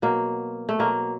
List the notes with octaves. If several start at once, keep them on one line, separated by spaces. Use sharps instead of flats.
B2 F#3 A#3
A3
B2 F#3 A#3